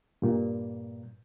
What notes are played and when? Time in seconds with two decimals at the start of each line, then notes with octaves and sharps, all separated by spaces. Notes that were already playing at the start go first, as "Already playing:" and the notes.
0.22 G2 A#2